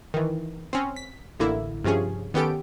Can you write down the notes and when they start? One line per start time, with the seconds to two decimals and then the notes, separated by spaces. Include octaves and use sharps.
0.14 D#3 E3
0.73 C4 C#4
0.96 B6
1.40 A1 D3 A#3 E4
1.84 G2 C3 F3 C#4 G#4
2.34 D#3 B3 C#4 G4 A4 D7